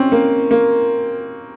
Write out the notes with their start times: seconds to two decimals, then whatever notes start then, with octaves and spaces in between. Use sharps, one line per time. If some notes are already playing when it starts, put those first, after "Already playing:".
Already playing: C4 C#4
0.12 A#3
0.51 A#3